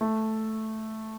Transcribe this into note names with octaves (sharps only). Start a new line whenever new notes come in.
A3